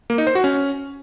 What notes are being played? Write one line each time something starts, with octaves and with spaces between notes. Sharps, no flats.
A#3
D#4
C5
F#4
C#4